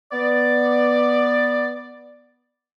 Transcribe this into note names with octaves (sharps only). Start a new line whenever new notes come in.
B3 D5